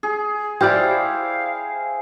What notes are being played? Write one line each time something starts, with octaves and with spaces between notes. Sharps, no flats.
G#4
E4 G4 C5 D5 F5 G5 F6